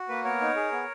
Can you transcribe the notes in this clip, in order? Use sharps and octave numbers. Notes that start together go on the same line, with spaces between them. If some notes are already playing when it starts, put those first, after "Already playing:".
Already playing: F#4
A#3 B4
B3 A#4 C#5
D#4
G#4
B3